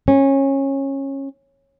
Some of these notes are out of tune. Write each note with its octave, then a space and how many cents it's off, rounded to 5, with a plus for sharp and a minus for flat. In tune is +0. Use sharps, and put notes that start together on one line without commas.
C#4 -20